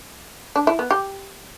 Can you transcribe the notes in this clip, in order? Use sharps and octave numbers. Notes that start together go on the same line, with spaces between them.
D4
E4
B3
G4